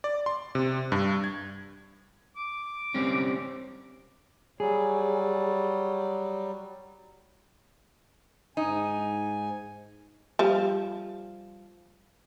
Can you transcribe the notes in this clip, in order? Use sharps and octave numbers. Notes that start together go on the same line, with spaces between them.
D5
C6
C3
G2
G#6
D6
G3 C4 C#4
F#3 G3 G#4
G#2 D#4 G#5
F3 G3